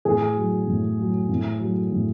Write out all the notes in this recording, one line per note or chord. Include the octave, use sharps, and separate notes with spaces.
A2 G#4
F#3
A2
F#3
A2
F#3
A2